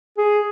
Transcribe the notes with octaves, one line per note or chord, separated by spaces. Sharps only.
G#4